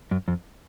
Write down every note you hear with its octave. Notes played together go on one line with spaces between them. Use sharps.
F#2
F2